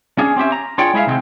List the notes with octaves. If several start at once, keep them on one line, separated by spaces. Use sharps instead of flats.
C#4 D4 G#4
C4 C#4 G4 E5
A#5
D4 F4 G#4 C#5 D5 G5
G#3 E4 G#4 E5 F5
C3 D#3 G3 G#3 C4